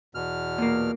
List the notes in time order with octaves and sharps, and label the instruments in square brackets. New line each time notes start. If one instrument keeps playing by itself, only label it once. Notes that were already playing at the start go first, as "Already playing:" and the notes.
[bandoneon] E2 B2 F6
[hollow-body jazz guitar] A#2 A#3